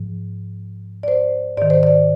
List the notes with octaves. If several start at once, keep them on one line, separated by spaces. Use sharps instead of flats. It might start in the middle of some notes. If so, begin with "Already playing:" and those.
Already playing: G#2 F3
D5
C5
G#2 D#3 D5
C5
D5